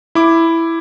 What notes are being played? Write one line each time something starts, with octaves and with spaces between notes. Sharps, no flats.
E4 D6